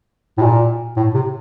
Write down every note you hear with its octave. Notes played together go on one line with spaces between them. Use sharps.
A2
A#2
A2
C3